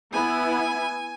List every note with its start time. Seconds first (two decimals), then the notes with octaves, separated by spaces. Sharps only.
0.13 B3 E4 G#5